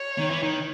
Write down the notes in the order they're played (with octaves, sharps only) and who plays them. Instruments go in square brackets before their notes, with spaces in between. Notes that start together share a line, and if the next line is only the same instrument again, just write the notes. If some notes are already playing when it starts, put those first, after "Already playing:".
Already playing: [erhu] C#5
[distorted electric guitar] D#3
E3
D#3